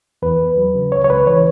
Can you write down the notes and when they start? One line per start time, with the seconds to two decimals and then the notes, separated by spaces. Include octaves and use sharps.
0.22 E2 B4
0.40 E2
0.57 F#3
0.75 C#3
0.92 C#2 C#5
1.04 C#5
1.10 C#2 B4
1.27 E3 C#5